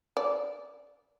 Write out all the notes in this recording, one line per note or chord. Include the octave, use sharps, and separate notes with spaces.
D5